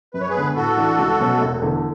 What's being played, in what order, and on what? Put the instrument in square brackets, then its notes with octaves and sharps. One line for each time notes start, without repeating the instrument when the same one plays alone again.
[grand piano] F#2 [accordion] B4
[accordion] C#5
G#4 B4
[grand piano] D3 G#3 B3
[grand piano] A2 [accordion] F#4 A4
[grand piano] E3 A3 D4
C#2
B2 F#3 A3 C#4
E1
E2 D3 A3